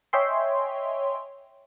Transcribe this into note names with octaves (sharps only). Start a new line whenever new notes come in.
C#5 D#5 E5 G5 G#5 C6